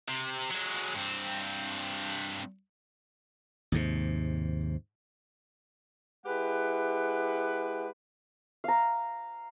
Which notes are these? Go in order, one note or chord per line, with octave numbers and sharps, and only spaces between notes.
C3
F#3 G#3
G2 C4
D#2 G#2 C3
G#3 E4 G4 B4 F#5
F5 A#5